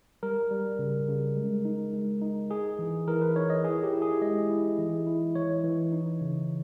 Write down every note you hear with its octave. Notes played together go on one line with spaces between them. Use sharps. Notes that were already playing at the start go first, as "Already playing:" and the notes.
G3 A#4
G3
C#3
C#3
G#3
D#4
G#3
D#4
D#4 G#4
E3
E3 A#4
B4
D#4 C#5
D#5
E4 G#4
G4
E4
G#4
G#3 D#5
E4
E3
E4
E3 C#5
E3
D#4
C#3